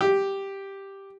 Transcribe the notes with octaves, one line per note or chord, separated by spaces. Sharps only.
G4